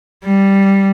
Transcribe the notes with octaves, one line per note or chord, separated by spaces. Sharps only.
G3